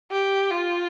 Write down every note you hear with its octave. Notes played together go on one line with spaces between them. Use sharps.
G4
F4